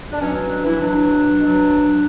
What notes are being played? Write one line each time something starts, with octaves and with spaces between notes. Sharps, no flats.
D4
B2 F#3 C#4
C#4
D4
E3 E4
B2 F#3 D4
B2 F#3